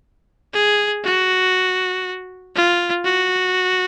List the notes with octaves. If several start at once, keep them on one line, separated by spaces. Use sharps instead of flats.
G#4
F#4
F4
F#4